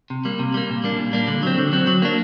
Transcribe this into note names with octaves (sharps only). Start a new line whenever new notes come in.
C3
G3 A#3
C3
G3 A#3
A#2
G3 A#3 D4
A#2
G3 A#3 D4
D3
F#3 C4
D3
F#3 C4
F#3
A#3 D4